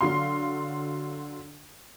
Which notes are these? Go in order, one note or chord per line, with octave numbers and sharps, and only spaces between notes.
D3 F#3 F5 C6